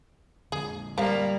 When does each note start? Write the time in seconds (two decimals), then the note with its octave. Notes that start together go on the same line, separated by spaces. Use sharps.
0.52 F2 D3 G#4
0.98 F3 G3 A#3 F5 A#5